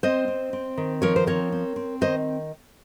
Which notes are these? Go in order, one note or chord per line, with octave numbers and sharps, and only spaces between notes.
C4 C5 D#5
C4
C4
D#3
F3 A#4 C#5
C5
C4 A#4 C#5
C4
C4
D#3 C5 D#5